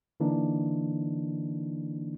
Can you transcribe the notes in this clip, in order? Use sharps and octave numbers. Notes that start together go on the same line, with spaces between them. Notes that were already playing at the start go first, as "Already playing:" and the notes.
D3 E3 A#3 D4 D#4